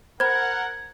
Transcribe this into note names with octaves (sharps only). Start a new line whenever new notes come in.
A#4 C5 F#5 B5 G#6